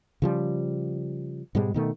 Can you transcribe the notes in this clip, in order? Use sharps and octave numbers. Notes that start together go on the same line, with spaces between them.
C#3 F3 G3
G#2 B2 G3 G#3
B2 D#3 A3